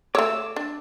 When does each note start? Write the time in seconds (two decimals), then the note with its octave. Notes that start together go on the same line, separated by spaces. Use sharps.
0.15 A3 C#5 D6 E6
0.56 D4